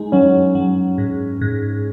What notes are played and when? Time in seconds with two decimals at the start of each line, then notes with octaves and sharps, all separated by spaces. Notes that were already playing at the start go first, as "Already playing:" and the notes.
Already playing: G#3 D#4
0.12 F#3 C#4
0.55 F#3
0.98 G#2
1.41 G#2